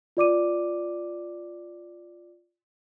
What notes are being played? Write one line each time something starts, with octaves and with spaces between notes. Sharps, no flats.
F4 D5 D6 D#7